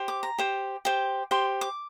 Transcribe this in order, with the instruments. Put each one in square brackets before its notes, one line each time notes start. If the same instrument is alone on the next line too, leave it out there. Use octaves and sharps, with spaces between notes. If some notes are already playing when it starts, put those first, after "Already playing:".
Already playing: [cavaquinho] G4 C5
D6
A#5
G4 C5
G4 C5
G4 C5 C6
D6